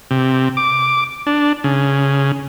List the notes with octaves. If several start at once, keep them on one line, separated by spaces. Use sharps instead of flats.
C3
D6
D4
C#3